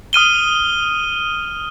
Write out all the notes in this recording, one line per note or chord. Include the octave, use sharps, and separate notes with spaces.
D#6 F6 D#7 G7